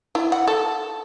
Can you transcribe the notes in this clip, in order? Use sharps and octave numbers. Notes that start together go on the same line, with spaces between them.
E4
F#5
A4